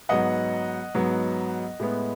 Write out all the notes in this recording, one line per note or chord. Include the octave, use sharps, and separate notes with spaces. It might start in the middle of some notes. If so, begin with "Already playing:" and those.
G#2 F#3 B3 D#5 F#5
G#2 F#3 B3
A2 G#3 B3